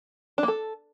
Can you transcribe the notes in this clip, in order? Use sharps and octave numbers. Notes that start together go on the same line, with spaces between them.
D4
A#3
A4